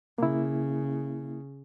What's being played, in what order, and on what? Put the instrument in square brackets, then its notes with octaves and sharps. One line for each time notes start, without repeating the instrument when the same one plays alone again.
[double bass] C#3 [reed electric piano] A#3 E4